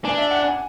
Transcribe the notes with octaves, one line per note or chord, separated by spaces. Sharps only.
D4 G#5
E5
F#5
G#5